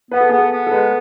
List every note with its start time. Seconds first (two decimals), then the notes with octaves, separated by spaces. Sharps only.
0.11 B3 B4
0.21 A4
0.29 B3 G#4
0.39 A4
0.52 B3
0.67 A4
0.71 G#3 B4